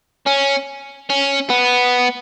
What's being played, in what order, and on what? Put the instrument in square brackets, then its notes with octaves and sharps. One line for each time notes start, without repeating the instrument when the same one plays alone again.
[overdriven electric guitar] C#4
C#4
B3